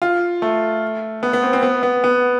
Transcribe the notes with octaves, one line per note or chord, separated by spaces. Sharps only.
F4
A3
B3
B3
C4
C4
B3
B3
B3